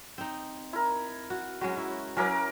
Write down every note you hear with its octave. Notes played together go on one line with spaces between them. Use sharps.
C4 D#4
E4 A#4
F#4
F#3 G#3 C#4 F#4
E4
F#3 C#4 E4 A#4 B4 D6